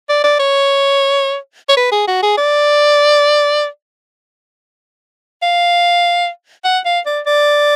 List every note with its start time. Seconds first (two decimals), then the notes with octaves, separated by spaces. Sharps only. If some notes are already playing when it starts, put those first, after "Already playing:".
0.09 D5
0.24 D5
0.40 C#5
1.69 C#5
1.77 B4
1.92 G#4
2.08 F#4
2.22 G#4
2.37 D5
5.42 F5
6.64 F#5
6.85 F5
7.06 D5
7.26 D5